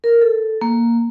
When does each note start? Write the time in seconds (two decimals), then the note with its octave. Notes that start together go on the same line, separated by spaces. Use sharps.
0.04 A#4
0.21 A4
0.61 A#3